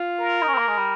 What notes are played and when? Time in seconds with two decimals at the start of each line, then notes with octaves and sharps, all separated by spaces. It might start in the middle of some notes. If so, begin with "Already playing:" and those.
Already playing: F4
0.19 A#4
0.42 D#4
0.48 C#4
0.54 C4
0.58 A#3
0.68 G#3
0.77 G3